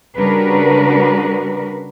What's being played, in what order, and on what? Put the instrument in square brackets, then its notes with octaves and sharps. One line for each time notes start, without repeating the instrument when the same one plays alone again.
[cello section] C#3 G3 D4 F#4 A#4 B4